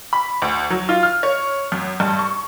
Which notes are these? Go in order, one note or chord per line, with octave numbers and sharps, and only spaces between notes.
B5
D2
F#3
F4
F6
C#5
F#2
G2
C#6